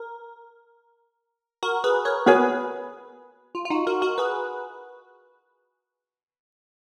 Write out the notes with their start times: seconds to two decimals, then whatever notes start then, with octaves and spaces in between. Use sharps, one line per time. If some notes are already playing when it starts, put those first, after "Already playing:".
Already playing: A#4
1.63 F#4 A#4
1.84 G#4 B4
2.05 A#4 C#5
2.26 B3 F#4 G#4 A#4 B4 C#5 G#5
3.55 F4
3.65 F4
3.70 D#4 F#4
3.87 F#4 A#4
4.02 F#4 A#4
4.18 G#4 B4